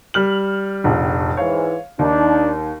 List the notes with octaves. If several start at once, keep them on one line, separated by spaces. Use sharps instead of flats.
G3 F6 F#7
F1 A#1 F2
G#2 E3 C#5 F5
D#2 D4 D#4